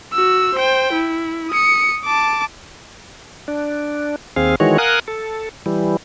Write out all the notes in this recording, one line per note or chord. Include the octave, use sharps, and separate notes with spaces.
F#4 E6
C5 G5
E4
D#6 C#7
A5 D6
D4
D#2 C4 G#4 F5
D#3 E3 G#3 F#4 C#5
A#4 F5 F#5 G#5 D#6 F#6
A4
E3 G3